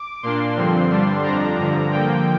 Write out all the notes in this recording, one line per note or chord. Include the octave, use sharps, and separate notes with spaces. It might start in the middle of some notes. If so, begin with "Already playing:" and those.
Already playing: D6
A#2 A#3 D4 C6
G2 D3 F3 C4
G2 D3 G3 D4
F2 F3 D4 A#5
G2 D3 F3
D3 F3 A#3 G5